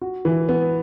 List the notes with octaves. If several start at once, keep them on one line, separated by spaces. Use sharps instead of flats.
F#4
E3
B3